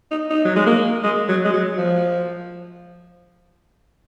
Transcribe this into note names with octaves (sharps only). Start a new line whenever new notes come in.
D#4
D#4
F#3
G#3
A#3
G#3
F#3
G#3
F#3
F3